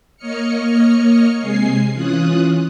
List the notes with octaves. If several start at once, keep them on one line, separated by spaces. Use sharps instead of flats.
A#3 C#5 D#5 F6 C#7
C3 G#3 G#5 C7
E3 C#4 F4 D#6 F#6